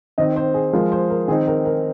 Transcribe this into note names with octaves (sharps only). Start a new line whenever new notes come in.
D#3 C4 D#4 D#5
C5
G#4
F3 G#3 F4 A#4
C5
A#4
D#3 C4 D#4 G#4
A#4
A#4